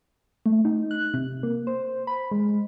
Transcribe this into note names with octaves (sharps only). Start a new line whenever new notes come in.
A3
D#4
F#6
C3
A#3
C5
B5
G#3